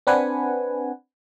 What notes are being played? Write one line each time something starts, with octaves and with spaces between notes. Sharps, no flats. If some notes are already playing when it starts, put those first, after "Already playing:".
C4 D4 B4 F#5 G#5